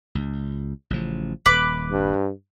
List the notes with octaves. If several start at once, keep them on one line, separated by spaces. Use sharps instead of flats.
C#2
A1 C#3 F3
D#1 B4 D6
G2